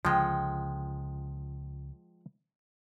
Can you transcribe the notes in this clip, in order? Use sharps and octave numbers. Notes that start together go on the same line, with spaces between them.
C#2 D3 F3 G#3 F#5 G5